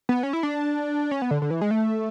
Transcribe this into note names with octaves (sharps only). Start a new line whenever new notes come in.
B3
C#4
E4
D4
C#4
B3
D3
D3
E3
G#3
A3